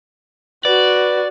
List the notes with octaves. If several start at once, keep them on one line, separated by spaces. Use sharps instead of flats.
F#4 B4 D5